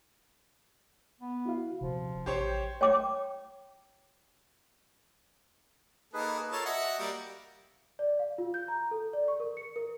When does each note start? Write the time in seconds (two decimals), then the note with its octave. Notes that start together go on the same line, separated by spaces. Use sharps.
1.20 B3
1.46 E4 F#4 F5
1.81 D#1 C3 F3
2.26 A1 G4 C5 C#5
2.81 C#5 G5 D6
6.14 A#3 D#4 G#4 A4 B4
6.52 F4 A4 A#4 C#5 A5
6.66 F#4 D#5 E5 F#5
6.98 G3 A#3
7.99 D5
8.19 F5
8.38 F4
8.54 G6
8.68 A#5
8.91 A4
9.13 D5
9.28 C#6
9.40 A#4
9.57 C#7
9.76 A#4